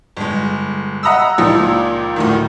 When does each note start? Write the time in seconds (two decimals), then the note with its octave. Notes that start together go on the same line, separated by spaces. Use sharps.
0.17 G1 G#3
1.03 D#5 F#5 A#5 B5 D#6 E6
1.38 C#2 A#2 F3 D#4 D#6 E6
2.16 D2 A2 D#3